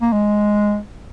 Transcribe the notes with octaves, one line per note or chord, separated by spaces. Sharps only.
A#3
G#3